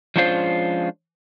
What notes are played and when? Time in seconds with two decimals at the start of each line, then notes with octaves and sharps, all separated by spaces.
0.16 F3 G#3 C#4 D4 F4 C5